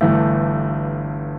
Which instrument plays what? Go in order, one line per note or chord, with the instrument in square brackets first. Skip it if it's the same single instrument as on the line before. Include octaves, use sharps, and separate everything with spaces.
[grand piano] G1 G2 E3 A3